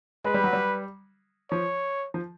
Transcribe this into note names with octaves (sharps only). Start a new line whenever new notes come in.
G#3 B4
G3
F#3
G3
F3 C#5
F3